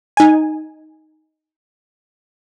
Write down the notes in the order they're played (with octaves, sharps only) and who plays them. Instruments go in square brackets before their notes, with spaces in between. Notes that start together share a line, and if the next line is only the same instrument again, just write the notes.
[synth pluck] D#4 G#5